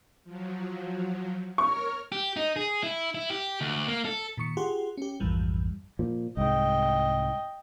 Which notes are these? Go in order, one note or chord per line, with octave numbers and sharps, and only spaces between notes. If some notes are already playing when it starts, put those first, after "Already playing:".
F3 F#3
A#4 C#5 C#6 F6
G4
D#4
G#4
E4
E4
G4
D2
A#3
A4
A#2 D#3 C#6 C#7
F4 G4 G#4 F#5 C6
C#4 G4
A#1 F2 G#2 E3 F3 G3
A#2 F3
C2 G#2 D#5 G5